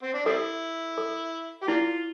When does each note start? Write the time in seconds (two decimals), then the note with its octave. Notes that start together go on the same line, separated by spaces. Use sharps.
0.03 C4
0.14 D4
0.26 G3 C4 E4 A4
0.98 A4
1.62 G4
1.68 A#3 D4 E4 F4